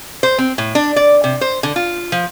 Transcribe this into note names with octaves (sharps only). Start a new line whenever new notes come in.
C5
C4
A2
D4
D5
C3
C5
D3
F4
F3